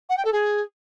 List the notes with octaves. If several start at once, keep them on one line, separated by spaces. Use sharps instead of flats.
F#5
G5
A4
G#4